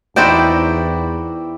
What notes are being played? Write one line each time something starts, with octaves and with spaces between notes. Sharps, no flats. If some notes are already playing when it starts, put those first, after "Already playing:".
E2 D#4 E4 F#4 C5 D5 G5